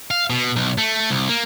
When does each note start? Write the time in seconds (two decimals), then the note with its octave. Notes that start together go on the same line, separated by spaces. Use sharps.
0.11 F5
0.30 B2
0.56 B1
0.78 A3
1.10 C2
1.29 A#3